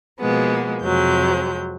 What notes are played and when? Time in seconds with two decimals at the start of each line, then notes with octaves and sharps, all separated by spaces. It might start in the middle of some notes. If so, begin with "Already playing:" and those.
0.20 B2 F3 G#3 A#3 B3
0.83 F2 C3 F#3 G#3 G6